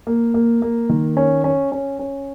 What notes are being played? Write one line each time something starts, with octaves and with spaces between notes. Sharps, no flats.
A#3
A#3
A#3
D#3
C#4
C#4
C#4
C#4